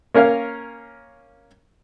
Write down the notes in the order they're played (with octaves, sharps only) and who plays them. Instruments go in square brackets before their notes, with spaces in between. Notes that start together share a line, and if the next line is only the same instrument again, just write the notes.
[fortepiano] A#3 C#4 A#4 F5